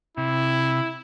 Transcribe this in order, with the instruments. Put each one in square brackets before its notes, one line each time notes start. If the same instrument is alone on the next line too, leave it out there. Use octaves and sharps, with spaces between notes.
[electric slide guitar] C3 [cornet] E4